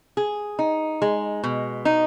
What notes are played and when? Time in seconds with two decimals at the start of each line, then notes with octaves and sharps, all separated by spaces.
0.17 G#4
0.59 D#4
1.02 G#3
1.44 B2
1.85 D#4